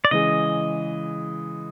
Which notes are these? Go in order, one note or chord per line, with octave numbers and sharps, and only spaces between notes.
D5
C#3 E3 G#3 D#5